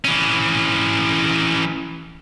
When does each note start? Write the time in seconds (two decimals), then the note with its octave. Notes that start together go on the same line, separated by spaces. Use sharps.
0.05 E3 C#4